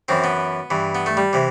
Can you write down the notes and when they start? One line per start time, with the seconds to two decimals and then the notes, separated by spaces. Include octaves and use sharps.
0.08 F#2 E3 C4
0.24 B3
0.70 G2 E3
0.95 B3
1.06 A3
1.17 G3
1.33 C3 E3